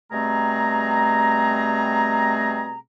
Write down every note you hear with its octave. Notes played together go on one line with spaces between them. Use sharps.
B2 G3 A3 C4 G#4 A#5